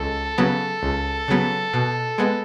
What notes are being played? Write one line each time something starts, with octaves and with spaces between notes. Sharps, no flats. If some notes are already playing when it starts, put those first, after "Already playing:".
Already playing: C#2 A4
C#3 F#3 B3
C#2
C#3 F#3 B3
B2
G#3 B3